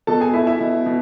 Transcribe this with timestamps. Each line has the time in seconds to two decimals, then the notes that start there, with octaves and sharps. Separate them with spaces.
0.07 B2 A4 A5
0.20 G#4 G#5
0.34 A3 E4 E5
0.47 E4 E5
0.60 B2
0.86 B2